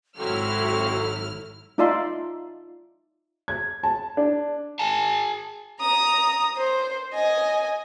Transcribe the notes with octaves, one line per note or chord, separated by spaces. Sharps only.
G#1 C3 F#3 E4 F#4 A4 F6
D#4 F4 D5 E5 A5 C6
G#6
A5
D4
G#4 G#5 A5
A#5 D#6
C5
D#5 G#5